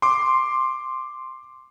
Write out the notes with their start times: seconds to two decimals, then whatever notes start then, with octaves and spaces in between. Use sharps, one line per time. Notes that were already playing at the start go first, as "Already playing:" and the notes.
0.02 C6 D6